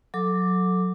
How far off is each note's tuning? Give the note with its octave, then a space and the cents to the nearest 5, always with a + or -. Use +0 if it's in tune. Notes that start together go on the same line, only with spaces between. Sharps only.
F#3 -20 A4 +0 D6 +0